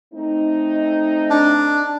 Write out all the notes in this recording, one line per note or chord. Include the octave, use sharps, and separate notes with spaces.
A3 C4 D#4
D4